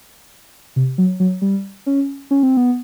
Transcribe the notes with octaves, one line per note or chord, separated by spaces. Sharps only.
C3
F#3
F#3
G3
C#4
C#4
C4
B3